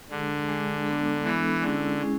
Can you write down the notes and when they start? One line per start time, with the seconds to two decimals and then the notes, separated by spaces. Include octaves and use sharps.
0.10 D3 G#3 D4 G#4
0.49 G#3 D4 G#4
0.87 G#3 B3 D4 A4
1.24 E3 G#3 B3 D4 A4
1.62 D3 G#3 C#4 E4 G#4
2.00 G#3 C#4 E4 G#4